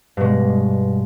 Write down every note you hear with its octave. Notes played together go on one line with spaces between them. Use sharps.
G2 B2 G#3